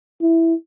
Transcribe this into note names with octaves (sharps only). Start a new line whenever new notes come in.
E4